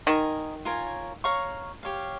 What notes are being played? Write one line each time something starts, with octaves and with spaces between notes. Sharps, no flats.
D#3 A#4 D#5 G#5
F4 A#4 C#5 G#5
C#5 F5 A#5 C#6
G4 C#5 F5